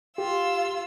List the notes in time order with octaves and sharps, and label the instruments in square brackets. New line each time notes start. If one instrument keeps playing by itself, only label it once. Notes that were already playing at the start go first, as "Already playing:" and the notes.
[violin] F4 E6 [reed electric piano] G4